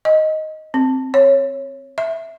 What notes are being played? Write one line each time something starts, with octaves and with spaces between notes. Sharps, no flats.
D#5
C4
C#5
E5